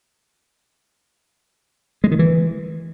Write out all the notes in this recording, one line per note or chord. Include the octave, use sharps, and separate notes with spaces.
G#3
D#3
E3